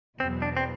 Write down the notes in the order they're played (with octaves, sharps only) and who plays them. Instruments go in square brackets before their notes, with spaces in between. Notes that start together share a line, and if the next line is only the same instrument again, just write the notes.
[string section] E2 B2 F#3 B3 [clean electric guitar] C4
[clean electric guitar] D4
C4